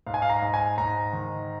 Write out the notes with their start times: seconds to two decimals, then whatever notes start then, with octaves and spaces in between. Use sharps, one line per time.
0.07 G#2 F5
0.14 G#5
0.22 F5
0.30 A#5
0.42 G#2
0.54 G#5
0.77 G#2 A#5
1.13 D#3